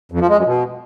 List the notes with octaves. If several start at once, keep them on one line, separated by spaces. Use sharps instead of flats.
F2
F3
G#3
F#2
B2